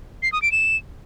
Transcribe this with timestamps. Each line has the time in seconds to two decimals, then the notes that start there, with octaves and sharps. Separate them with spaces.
0.23 C7
0.32 D#6
0.42 D7
0.52 E7